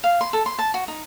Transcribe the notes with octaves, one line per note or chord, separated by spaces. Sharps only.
F5
C6
A4
C6
A5
F#4
D#4